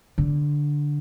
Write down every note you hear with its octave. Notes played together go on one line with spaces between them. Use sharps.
D3